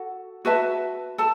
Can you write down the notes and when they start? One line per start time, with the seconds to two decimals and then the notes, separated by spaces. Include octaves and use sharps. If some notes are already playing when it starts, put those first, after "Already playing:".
Already playing: F#4 A4 F#5
0.45 F#4 B4 E5 A5
1.18 A4 A5